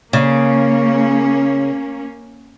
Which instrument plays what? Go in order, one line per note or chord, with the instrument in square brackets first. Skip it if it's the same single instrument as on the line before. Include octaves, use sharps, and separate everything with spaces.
[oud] C#3 [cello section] A#3 C#4